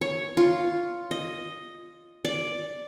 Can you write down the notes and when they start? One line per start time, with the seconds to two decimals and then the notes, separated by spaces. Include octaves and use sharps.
0.01 C#5
0.37 F4
1.11 D#5
2.25 D5